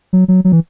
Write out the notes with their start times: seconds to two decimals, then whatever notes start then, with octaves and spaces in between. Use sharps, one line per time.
0.13 F#3
0.28 F#3
0.45 F#3
0.52 E3